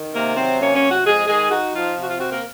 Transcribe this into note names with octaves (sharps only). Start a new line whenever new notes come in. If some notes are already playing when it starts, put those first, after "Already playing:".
Already playing: D#3
C3 A#3 A#4
F#3 C4 C5
A#3 C#4 C#5
C#4 C#5
C3
F#4
F2 G#3 G#4
D#3 G#3 G#4
D#4 F#4
F3 F4
C3 F#4
F4
C4 F#4
A#3 A#4